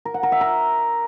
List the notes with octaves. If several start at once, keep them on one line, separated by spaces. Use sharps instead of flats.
A#4
F#5
A#4
E5
A#4